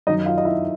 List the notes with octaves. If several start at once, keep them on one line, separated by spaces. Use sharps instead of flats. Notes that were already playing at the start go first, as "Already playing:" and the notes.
F#2 D#3 F#3 D#4 D#5
F4 F5
D#5
E4 E5